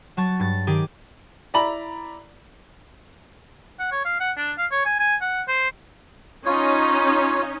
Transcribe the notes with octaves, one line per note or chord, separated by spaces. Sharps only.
F#3 A5 C#6 A6
G2 A6
D#3 G4 G#4 D6
E4 D5 A#5 B5 F#7
F#5
C#5
F5
F#5
D4
F5
C#5
G#5
G#5
F#5
C5
C#4 D#4 F4 C#5